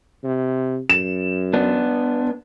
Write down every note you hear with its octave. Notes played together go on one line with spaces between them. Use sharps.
C3
F#2 E7
B3 D4